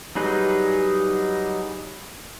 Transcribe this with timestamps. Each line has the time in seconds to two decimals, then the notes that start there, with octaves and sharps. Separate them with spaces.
0.15 F#3 G3 D#4 G#4 B4